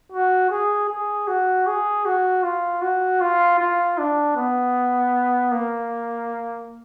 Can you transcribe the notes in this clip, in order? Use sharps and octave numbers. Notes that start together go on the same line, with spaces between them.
F#4
G#4
G#4
F#4
G#4
F#4
F4
F#4
F4
F4
D4
B3
A#3